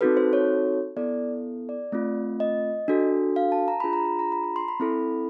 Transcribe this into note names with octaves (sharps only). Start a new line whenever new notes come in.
C4 D#4 F#4 A4 B4
C5
C#5
B3 E4 A4 D5
D5
A3 C4 F4
D#5
D4 F#4 A4
F5
A5
A#5
D4 F4 G#4 B5
A#5
B5
A#5
B5
A#5
C6
B5
C4 E4 A4